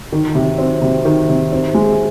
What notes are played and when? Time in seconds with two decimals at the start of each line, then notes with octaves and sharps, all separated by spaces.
0.12 D#3
0.35 C3
0.58 C4
0.82 C3
1.05 D#3
1.29 C3
1.52 C4
1.74 G#3